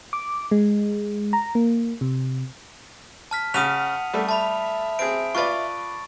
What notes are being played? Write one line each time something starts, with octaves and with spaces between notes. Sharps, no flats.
D6
G#3
A#5
A#3
C3
A5 F6 B6
C#3 F#5 D#6 D#7 F7
G3 A3
E5 A5 B5 F7
C4 G#4 D7
F4 B4 D5 C#6 A6